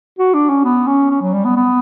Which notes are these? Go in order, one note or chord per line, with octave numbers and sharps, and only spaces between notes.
F#4
D4
C#4
B3
C#4
C#4
F#3
G3
B3
B3